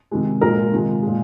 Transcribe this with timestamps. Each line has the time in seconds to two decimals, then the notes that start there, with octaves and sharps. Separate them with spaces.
0.11 C3 D#3 G#3
0.41 A#2 F3 G#3 A#4
0.57 F4
0.72 C3 D#3 G#3
1.03 A#2 G#3